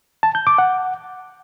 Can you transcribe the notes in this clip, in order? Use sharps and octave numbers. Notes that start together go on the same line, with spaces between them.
A5
G6
D6
F#5